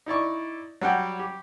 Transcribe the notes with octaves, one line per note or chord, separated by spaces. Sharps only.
D#4 E4 D5 C#6
F#3 G3 F#5 G5
G4